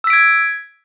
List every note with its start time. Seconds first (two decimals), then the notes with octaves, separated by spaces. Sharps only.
0.04 E6
0.07 B6
0.10 D7
0.13 G#6